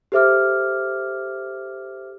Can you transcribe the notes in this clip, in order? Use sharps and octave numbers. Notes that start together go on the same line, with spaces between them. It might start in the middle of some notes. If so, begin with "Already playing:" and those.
G4 A4 C5 E5 D6 F6